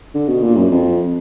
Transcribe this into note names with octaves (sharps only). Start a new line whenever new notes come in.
D3
B2
A#2
F#2
F2